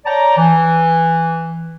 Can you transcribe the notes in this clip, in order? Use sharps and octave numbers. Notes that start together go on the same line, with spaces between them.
C#5 D5 G5 A5 A#5
E3